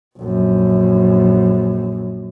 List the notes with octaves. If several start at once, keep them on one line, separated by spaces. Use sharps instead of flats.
A#1 F#2